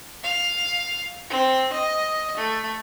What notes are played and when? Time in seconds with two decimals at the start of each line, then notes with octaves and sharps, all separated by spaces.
0.23 F5
1.30 C4
1.73 D#5
2.37 A3